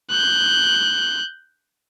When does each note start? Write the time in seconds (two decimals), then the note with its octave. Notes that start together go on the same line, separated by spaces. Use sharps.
0.10 F#6 G6